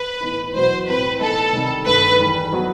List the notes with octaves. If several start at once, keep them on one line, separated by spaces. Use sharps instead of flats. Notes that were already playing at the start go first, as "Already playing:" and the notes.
Already playing: B4
A2 E3 B3 D#4
E2 B2 F#3 B3 F#4 C5
A2 G3 C4 E4 B4
A2 E3 G3 B3 D#4 A4
C3 D#3 G3
G2 D#3 A3 B4
E2 D#3 G3
F#3 B3 F#4